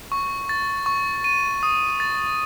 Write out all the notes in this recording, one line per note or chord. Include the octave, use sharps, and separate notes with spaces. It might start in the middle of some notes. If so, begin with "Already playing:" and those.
C#6
A6
C#6
D#7
D#6
A6